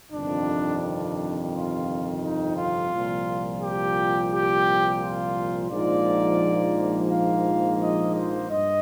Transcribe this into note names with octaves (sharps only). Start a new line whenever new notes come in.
G1 F2 C3 D#3 D4
D4
F4
D#4
F4
C2 A#2 F3
G4
G4
F4
A#1 G#2 F3 A#3 D5
F5
D#5
C5
G2 D#5